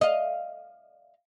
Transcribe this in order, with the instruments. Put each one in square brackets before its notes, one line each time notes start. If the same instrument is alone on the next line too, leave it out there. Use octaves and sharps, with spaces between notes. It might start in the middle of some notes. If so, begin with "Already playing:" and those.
[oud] D#5 F5